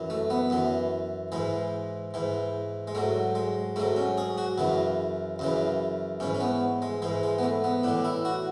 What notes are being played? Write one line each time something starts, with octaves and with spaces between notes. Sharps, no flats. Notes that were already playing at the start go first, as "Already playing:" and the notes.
Already playing: F#2 E3
A3
B3
F#2 E3
G#2 E3 G#3
G#2 E3
G#3
G#2 F#3 A3
G#3
G#2 F#3 A3
C#4
G#4
F#4
F#2 C#3 E3
F#2 C#3 E3
G#2 E3 C#4
C#4
B3
G#3
G#2 E3 G#3
G#3
B3
A3
B3
A2 E3 D4
E4
F#4